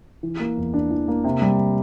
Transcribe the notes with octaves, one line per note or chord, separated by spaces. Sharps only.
E3
A#3
E2
D4
E3
A#3
C3
G3